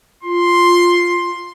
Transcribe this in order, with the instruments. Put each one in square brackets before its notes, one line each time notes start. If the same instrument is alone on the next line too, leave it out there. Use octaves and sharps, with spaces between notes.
[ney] F4 [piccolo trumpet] C6